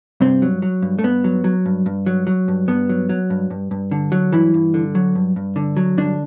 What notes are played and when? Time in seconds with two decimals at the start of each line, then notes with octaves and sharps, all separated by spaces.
0.21 G2 C3 C4
0.42 F#3
0.62 F#3
0.82 G2
0.99 A3
1.03 G2 B3
1.24 F#3
1.44 F#3
1.66 G2
1.86 G2
2.06 F#3
2.27 F#3
2.48 G2
2.68 G2 B3
2.89 F#3
3.09 F#3
3.30 G2
3.50 G2
3.71 G2
3.91 D3
4.12 F#3
4.33 G2 E3 E4
4.54 G2
4.74 D3
4.95 F#3
5.15 G2
5.36 G2
5.56 D3
5.77 F#3
5.97 G2 D3 D4